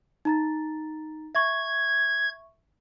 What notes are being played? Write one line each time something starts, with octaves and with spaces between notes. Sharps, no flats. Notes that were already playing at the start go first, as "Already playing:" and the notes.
D#4 A#5 A6
E5 C#6 G#6